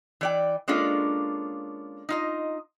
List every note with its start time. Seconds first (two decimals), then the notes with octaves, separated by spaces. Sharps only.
0.21 E3 D5 G5
0.68 G#3 A#3 C#4 D4 F4 A4
2.09 D#4 F4 D#5